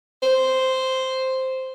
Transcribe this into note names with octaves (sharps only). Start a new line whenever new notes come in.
C5